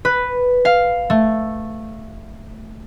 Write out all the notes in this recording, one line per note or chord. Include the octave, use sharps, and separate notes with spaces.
B4
F5
A3